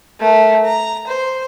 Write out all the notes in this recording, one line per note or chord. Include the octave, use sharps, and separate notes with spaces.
A3 A#4
A#5
C5